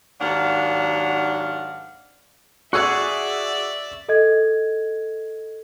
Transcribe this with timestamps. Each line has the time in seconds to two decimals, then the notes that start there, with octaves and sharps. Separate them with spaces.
0.21 D#2 G#2 F#3 D4 F5 F#5
2.73 F#4 G#4 D5 E5 F#5 C#6 E6
4.08 A4 D#5 G#6